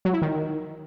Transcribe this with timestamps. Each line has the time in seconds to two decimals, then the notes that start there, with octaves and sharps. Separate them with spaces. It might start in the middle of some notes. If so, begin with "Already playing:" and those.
0.05 F#3
0.13 E4
0.22 D#3